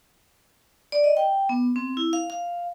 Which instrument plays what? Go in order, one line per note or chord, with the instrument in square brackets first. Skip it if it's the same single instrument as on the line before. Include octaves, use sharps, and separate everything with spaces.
[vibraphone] D5
D#5
G5
B3
C4
E4
F5
F5